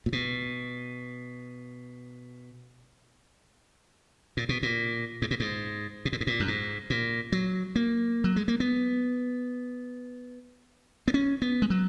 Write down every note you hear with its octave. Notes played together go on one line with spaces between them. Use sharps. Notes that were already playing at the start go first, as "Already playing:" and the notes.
A#2
B2
A#2
B2
A#2
G#2
A#2
G#2
B2
A#2
G#2
A#2
F#2
G#2
A#2
F#3
A#3
F#3
G#3
A#3
B3
B3
C#4
B3
G#3
F#3